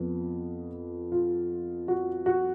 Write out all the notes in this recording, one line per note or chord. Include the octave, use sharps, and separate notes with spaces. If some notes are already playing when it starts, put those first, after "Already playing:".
Already playing: F2 F3 B3
F4
F#4
F#4